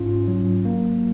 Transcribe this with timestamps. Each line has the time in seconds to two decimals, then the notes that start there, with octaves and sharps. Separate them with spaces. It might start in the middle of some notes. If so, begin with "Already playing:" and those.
Already playing: G#2 C#4 F4
0.28 F#3
0.65 A#3